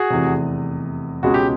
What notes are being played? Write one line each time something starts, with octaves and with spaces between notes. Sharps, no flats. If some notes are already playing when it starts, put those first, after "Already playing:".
Already playing: F#4 G#4
F1 E2 C3
C#2 B2 G#3 C#4 F#4
G4